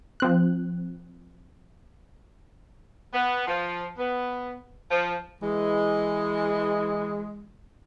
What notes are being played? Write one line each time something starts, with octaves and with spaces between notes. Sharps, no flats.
F3 C4 F#6
B3
F3
B3
F3
E3 G#3